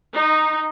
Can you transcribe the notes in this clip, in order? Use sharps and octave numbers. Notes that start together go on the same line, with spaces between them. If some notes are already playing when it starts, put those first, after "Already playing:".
D#4